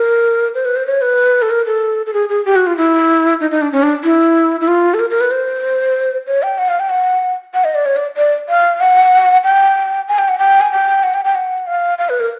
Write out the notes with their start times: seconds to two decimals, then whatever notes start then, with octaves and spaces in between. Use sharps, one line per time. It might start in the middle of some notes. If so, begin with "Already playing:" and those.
Already playing: A#4
0.55 C5
0.65 B4
0.76 C5
0.86 C#5
1.02 B4
1.42 A4
1.50 A#4
1.66 A4
2.06 A4
2.13 G#4
2.29 G#4
2.45 G4
2.56 F#4
2.67 F4
2.77 E4
3.40 D#4
3.51 D#4
3.61 D4
3.72 C#4
3.83 D4
4.04 E4
4.61 E4
4.68 F4
4.94 A4
4.99 A#4
5.10 A#4
5.21 B4
5.31 C5
6.27 C#5
6.43 G5
6.58 F#5
6.69 F5
6.80 G5
6.90 F#5
7.54 F#5
7.65 D#5
7.75 D5
7.86 C#5
7.96 D5
8.17 D5
8.49 F5
8.81 F#5
9.44 G5
10.08 G#5
10.18 G5
10.29 F#5
10.38 G5
10.61 G#5
10.72 G5
11.03 F#5
11.14 G5
11.25 G5
11.35 F#5
11.67 F5
11.98 F5
12.09 B4
12.20 A#4